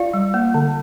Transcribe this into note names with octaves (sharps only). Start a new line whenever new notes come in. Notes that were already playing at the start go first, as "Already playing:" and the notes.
Already playing: F4 D5 F5
G3
A#3
D3